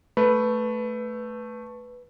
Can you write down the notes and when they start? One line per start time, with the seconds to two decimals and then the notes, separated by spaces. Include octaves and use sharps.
0.17 A3 B4